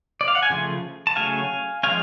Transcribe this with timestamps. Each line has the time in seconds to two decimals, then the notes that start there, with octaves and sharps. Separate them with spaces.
0.21 D5
0.28 F5
0.35 F#5
0.43 G#5
0.50 C#3 F3 A3
1.07 A5
1.16 C#3 F#3 A3 C#4 F5 G#5
1.83 F3 G#3 C#4 F5 G#5